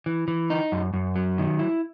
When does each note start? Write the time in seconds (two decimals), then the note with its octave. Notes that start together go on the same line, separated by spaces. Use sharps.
0.06 E3
0.28 E3
0.50 D#4
0.72 F#2
0.94 F#2
1.16 F#3
1.38 D#3
1.59 E4